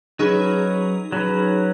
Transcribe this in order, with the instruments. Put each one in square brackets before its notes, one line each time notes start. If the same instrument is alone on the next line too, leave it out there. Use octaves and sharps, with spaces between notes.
[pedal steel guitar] F#3 C#4 B4 [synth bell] D#4 G#4
[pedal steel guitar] F#3 C#4 B4